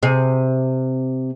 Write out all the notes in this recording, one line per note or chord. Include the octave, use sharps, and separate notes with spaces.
C3 G#4